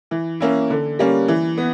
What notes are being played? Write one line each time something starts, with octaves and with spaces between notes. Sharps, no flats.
E3
A#3 C#4 E4
D3
G3 A#3 C#4
E3
B3